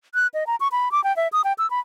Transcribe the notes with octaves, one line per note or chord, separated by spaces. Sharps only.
F#6
D#5
A#5
C#6
B5
D6
G5
E5
D#6
G5
E6
B5